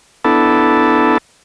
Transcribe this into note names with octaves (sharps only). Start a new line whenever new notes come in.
B3 D4 E4 A4